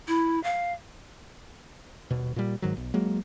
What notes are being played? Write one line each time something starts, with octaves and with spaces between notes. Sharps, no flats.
E4
F5
D#1 B2
A#2 G3
G#2 D#3 F#3
B1
F#3 G#3 A#3